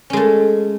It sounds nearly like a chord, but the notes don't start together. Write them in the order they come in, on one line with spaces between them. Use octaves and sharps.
C#4 G#3 A3